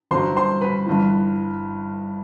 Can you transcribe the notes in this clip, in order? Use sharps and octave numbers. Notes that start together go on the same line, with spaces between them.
G1 G2 D3 F#3 C5 C6
C5 C6
B4 B5
G1 G2 E3